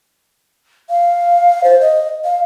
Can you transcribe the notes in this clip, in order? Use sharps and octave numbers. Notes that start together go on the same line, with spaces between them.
F5
C5
D#5
F5